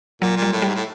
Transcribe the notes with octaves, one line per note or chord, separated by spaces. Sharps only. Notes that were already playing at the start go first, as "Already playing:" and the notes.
A#2 F#3
A#2
G3
A2
G3
G#2
A2